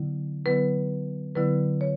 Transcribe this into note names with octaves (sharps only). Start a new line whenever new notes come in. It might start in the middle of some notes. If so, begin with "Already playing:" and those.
Already playing: D3 F#3 B3 E4
D3 F#3 B3 E4 B4
D3 F#3 B3 E4 B4
C#5